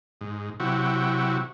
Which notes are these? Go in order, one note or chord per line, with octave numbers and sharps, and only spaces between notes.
G#2
C3 F#3 E4 F#4 G4